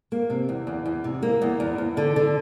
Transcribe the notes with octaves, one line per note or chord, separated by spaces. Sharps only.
A#3
C3
E2
E2
E2
C3
A#3
E2
E2
E2
D3
D3